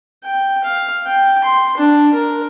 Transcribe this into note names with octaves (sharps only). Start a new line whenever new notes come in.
G5
F5
G5
C6
D4
A#4